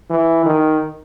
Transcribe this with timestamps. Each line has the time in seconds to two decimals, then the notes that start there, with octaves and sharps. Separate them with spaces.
0.10 E3
0.46 D#3